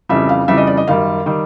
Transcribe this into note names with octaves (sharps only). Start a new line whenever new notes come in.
F2 C#3 E3 G3 E5
F5
F2 C#3 E3 G3 E5
D#5
D5
D#5
F#2 D#3 G3 F5
D#3 G3